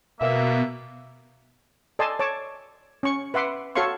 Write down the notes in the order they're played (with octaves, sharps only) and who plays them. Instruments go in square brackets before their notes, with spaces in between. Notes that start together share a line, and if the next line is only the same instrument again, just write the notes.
[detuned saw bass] B2 [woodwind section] A#3 E5
[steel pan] A4 D5 D#5 G#5 A5 C6
C#5 A5 D6
C#4 C#6
B4 E5 F#5 C6 D6
F#4 A4 C#5 F5 C6 C#6